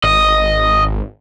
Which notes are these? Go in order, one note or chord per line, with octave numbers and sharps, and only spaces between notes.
G#1 D#5